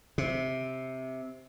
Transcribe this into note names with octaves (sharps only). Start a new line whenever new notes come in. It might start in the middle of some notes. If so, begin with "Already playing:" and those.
C3